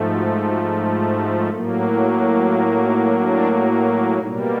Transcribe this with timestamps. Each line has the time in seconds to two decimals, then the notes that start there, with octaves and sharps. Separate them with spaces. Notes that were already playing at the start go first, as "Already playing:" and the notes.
Already playing: G#2 F3 A3
0.14 F#4
0.48 F#4
1.16 F#4
1.49 A2 F#3 A#3
2.16 F#4
2.51 F4
2.84 D#4
3.18 D4
4.18 B2 G3 A#3 D#4